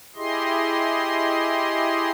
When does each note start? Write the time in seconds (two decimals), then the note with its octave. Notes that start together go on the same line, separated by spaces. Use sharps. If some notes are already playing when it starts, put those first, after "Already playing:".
0.16 E4 G4 G#4 D#5 C6